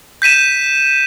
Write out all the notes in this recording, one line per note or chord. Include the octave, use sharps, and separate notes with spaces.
G6 B6 D#7 E7